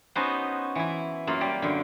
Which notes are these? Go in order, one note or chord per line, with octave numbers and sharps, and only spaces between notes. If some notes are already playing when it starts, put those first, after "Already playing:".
B3 C#4 D#4 F#4 B4 C5
E3 E4
F#2 A#3 F4
G3 G4 D5
F#2 D3